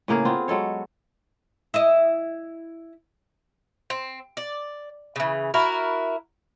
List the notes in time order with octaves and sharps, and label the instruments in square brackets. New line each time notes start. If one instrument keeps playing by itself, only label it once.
[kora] A2 C#3 A#3 G#4
B3 C4 F4
F#3 G#3 A4 C#5
[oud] E4 D#5
[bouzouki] C4
D5
C#3 E3
E4 F#4 A#4